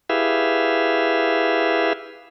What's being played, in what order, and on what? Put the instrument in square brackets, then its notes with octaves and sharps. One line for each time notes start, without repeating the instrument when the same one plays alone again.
[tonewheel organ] E4 G4 G#4 B4 E5 F5